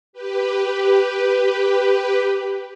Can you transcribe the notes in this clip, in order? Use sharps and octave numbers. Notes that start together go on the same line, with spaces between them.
G4 B4